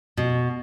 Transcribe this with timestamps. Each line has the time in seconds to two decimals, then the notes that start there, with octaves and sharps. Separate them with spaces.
0.17 B2